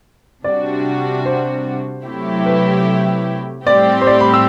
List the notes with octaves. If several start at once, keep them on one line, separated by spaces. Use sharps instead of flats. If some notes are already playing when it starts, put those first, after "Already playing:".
C3 G3 D4 F#4 D5
C5
C3 F#3 A3 E4 G4
B4
A2 G3 C4 G4 D5
C5
D5
B5
E6